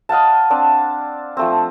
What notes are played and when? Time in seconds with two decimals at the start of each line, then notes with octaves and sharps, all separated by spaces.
0.09 D#5 F5 F#5 A5
0.50 C4 D4 D5
1.37 F3 A3 C4